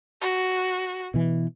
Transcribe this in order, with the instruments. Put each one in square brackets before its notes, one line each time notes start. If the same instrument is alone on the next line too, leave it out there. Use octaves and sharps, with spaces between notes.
[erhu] F#4
[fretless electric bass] B2 E3